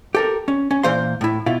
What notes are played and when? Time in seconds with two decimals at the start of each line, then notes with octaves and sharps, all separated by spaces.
0.15 G4 A4 A#4
0.48 C#4
0.71 C#4
0.83 A#2 E3 A#3 C5 F5 C6
1.21 A2 E4
1.46 B2 E4 F4